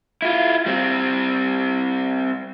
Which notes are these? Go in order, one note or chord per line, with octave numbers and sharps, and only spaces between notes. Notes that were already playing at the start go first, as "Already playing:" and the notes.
E4 F4
G3 C4